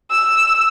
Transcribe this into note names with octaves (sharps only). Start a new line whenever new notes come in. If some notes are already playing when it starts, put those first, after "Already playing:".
E6